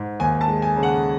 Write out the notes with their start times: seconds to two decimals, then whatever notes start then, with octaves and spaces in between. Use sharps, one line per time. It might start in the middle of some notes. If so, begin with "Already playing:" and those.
Already playing: G#2
0.20 D#2 G#5
0.41 A5
0.48 G#3
0.62 G#5
0.77 C#3
0.83 F#5